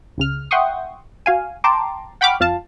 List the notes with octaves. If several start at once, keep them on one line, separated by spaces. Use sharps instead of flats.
C#2 C#3 F6
E5 F#5 G5 C6 C#6 D#6
F#4 F5 G#5
G5 A5 A#5 C6 D6
F#5 G5 B5 C#6 D6 F6
F2 F4 F5 A5